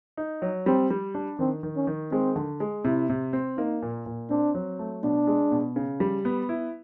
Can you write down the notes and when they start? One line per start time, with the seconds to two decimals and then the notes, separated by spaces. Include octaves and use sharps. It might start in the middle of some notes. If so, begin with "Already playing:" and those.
0.17 D#4
0.42 F#3
0.66 G3 C4
0.90 G3
1.15 D4
1.39 D#3 C4
1.63 D#3
1.76 C#4
1.87 D#3
2.11 G#3 C4
2.36 D3
2.60 G#3
2.84 C3 E4
3.09 C3
3.33 C4
3.57 A#3 D#4
3.82 A#2
4.06 A#2
4.30 C4 D4
4.55 F#3
4.79 A3
5.03 B2 D4
5.27 G#3
5.51 B2
5.76 C#3
6.00 G3
6.25 B3
6.49 E4